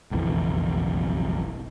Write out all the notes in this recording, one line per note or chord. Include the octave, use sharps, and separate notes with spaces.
F#1 B1 F2 E3